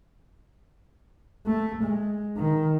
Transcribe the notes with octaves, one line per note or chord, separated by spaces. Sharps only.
A3
G#3
D#3